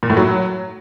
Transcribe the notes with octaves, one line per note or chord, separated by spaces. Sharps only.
A#2
A2
F#3